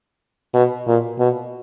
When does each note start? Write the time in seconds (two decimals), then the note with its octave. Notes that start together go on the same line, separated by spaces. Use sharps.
0.54 B2
0.87 A#2
1.19 B2